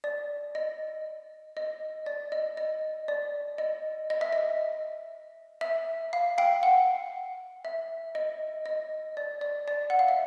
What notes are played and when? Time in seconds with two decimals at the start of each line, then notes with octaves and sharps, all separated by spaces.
0.04 D5
0.55 D#5
1.57 D#5
2.06 D5
2.32 D#5
2.57 D#5
3.08 D5
3.58 D#5
4.10 D#5
4.21 E5
4.33 D#5
5.61 E5
6.13 F5
6.38 F5 G5
6.63 F#5
7.65 E5
8.15 D#5
8.66 D#5
9.17 D5
9.41 D5
9.68 D5
9.90 F#5
9.99 F5
10.08 E5